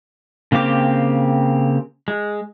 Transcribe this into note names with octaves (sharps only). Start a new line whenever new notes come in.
C#3 A#3 C4 G4 D6
G#3